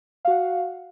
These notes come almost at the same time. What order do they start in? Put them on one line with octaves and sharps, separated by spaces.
F5 F#4 F#5